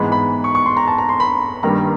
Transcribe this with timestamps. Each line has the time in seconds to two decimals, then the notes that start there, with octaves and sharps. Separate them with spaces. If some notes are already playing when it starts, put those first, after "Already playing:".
Already playing: G#2 E3 G#3 B3 B5
0.12 B5
0.44 C#6
0.55 C#6
0.66 C6
0.77 A#5
0.87 A5
0.98 A#5
1.09 C6
1.20 B5
1.63 G2 D#3 G3 A#3 A#5